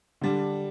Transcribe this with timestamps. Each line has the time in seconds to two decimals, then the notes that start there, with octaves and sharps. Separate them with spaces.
0.21 D3 G3 D4